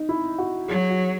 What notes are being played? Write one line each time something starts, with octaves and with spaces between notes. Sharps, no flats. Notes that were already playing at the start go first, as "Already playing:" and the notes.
Already playing: D#4
E4
F#4
F#3 G#4
F#4